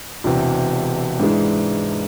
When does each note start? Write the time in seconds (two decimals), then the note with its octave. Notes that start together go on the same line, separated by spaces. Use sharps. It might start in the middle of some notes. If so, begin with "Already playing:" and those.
0.24 E1 E2 C3
1.20 G#2 E3 G#3 D4